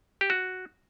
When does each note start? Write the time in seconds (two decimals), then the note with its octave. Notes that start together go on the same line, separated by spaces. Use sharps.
0.21 G4
0.30 F#4